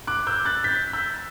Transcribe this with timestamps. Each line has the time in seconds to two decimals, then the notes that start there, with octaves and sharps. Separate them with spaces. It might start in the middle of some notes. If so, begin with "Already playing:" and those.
0.07 D6 F#6
0.27 E6 G6
0.45 F#6 A6
0.64 G6 B6
0.93 E6 G6